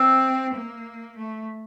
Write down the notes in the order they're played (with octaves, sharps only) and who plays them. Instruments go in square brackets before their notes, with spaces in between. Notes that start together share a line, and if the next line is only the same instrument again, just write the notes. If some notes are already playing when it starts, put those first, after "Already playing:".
Already playing: [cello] C4 [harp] E5
[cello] A#3
A3